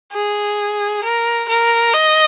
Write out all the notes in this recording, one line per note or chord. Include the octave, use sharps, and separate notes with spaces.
G#4
A#4
A#4
D#5